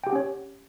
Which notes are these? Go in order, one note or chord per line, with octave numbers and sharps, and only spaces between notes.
C#4 G4 C#5 F#5 G5